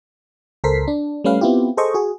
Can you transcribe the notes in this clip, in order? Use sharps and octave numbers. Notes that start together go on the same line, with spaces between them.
C#2 A4 A#4 C5 B6 C7
D4
G3 A3 C#4 B4 F5
B3 C4 E4 F4 G4
G#4 A4 C5 D#5 C#6
F#4 G#4